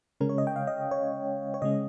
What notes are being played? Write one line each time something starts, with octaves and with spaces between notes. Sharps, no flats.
C#3 G#3 C#4 A#4
C#5
D#5
G5
F5
D#5
C#5
C#5
C#3 G#3 C#4 D#5